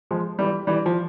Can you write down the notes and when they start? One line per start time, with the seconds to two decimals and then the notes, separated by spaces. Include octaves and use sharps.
0.11 F3 G#3
0.39 E3 G3
0.67 E3 G3
0.86 F3